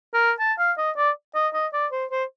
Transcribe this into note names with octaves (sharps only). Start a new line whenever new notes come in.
A#4
A5
F5
D#5
D5
D#5
D#5
D5
C5
C5